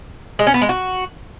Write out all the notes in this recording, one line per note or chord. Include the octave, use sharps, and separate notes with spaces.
G#3
C#4
B3
G#3
F#4